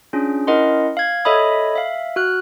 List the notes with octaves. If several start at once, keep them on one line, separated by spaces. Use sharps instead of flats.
C#4 D4 F4 G#4
C#4 E4 A#4 D#5 F#5 C6
F5 G#6
A4 C#5 D#5 E5 B5 D#6
E5 F5
F#4 F6 F#6